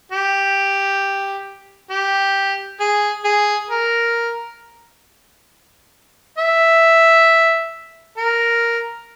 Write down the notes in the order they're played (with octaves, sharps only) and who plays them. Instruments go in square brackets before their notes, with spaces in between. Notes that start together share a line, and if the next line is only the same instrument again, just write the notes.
[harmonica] G4
G4
G#4
G#4
A#4
E5
A#4